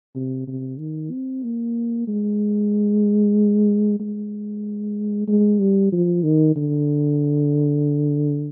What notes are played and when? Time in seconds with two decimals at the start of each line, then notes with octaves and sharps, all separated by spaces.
0.15 C3
0.47 C3
0.79 D#3
1.11 C4
1.44 A#3
2.08 G#3
4.00 G#3
5.28 G#3
5.60 G3
5.92 F3
6.23 D#3
6.56 D3